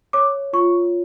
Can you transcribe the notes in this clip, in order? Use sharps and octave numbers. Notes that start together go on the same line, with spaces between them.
C#5 D6
F4 C#6